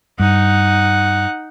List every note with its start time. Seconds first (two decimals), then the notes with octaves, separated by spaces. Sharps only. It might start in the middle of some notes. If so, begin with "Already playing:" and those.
0.20 G2 D#4 F#5